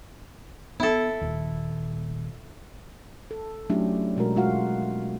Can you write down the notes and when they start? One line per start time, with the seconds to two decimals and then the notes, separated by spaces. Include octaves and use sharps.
0.80 B3 E4 A4
1.22 D#1 D#2
3.31 A4
3.70 F#3 A3 C#4 D4 E4 G4
4.17 B2 G#3 F#4 A#4
4.36 G#3 F4 F#4 F5 F#5